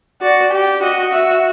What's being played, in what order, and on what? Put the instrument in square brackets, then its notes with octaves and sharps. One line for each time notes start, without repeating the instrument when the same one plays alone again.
[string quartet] F#4 [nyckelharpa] D5
[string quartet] G4
[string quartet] F#4 [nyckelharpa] D#5
[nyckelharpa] E5